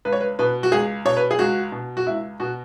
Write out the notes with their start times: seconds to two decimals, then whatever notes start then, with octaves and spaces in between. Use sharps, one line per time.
0.05 C#2 B4
0.13 C#5
0.21 B4
0.39 B2 B4
0.63 F#4
0.72 C#2 G#4
1.05 B2 C#5
1.17 B4
1.31 G#4
1.39 C#2 F#4
1.72 B2
1.97 F#4
2.06 C#2 E4
2.40 B2 F#4